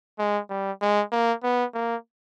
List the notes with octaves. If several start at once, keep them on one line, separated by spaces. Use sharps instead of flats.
G#3
G3
G#3
A#3
B3
A#3